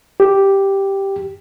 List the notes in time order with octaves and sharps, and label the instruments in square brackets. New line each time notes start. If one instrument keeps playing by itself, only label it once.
[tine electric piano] G4